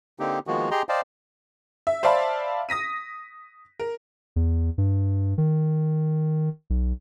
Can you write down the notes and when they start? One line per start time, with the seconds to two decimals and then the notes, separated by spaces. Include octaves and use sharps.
0.19 D3 A#3 C4 D#4 G4
0.47 D#3 F3 G#3 A#3 B3 F#4
0.71 G4 G#4 D#5 G5 A#5 C6
0.89 C5 D5 D#5 F5 G5 A5
1.87 E5
2.03 C5 D5 E5 F5 A5 B5
2.69 D#6 A#6 B6 D#7
3.80 A#4
4.36 E2
4.78 G2
5.38 D#3
6.70 B1